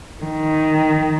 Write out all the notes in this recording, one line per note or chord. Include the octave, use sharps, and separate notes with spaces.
D#3